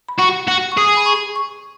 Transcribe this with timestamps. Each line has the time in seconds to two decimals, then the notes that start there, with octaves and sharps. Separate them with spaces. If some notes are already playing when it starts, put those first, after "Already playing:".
0.09 B5
0.19 F#4 C#6
0.48 F#4
0.72 C#6
0.77 G#4 D#6
0.97 B5
1.06 C#6
1.36 C#6